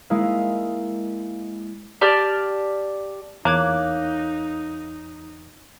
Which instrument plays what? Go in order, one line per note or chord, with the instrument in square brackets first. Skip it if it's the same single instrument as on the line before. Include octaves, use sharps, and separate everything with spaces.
[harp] G#3 A#3 E4 D#5 F5
[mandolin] G4 D5 A5 F6
[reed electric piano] E2 F#6 [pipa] A#3 [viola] D#4 [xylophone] C#5 D6 G#6